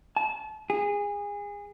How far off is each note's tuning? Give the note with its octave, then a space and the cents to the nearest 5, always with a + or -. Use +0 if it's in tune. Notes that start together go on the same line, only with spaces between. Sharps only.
A5 -30
G#4 -25